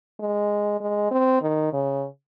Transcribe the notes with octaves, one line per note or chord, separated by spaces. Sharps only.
G#3
G#3
C4
D#3
C#3